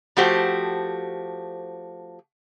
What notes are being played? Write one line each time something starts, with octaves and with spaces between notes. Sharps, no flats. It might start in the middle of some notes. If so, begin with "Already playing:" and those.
F3 A3 F#4 G4 C5